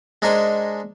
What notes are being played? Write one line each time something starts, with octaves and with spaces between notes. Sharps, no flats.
G#3 D4 D#4 A#4 C5 G#5